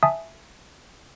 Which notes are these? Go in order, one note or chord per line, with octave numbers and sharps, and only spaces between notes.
E5 G#5 A5 D#6